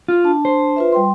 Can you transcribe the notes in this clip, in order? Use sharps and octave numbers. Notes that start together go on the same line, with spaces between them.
F4
D4 A5
C5
F4 B4 E5
G3 G5 C6